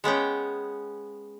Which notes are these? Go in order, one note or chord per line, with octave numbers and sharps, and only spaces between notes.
G#3 B3 C#4 G5